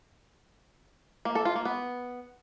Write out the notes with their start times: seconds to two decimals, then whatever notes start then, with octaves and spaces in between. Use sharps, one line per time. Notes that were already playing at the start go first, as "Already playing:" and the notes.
1.25 A#3
1.35 A4
1.45 F4
1.55 A#3
1.65 B3